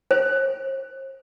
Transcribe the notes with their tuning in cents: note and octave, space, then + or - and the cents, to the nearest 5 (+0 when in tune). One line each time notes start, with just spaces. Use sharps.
C5 +40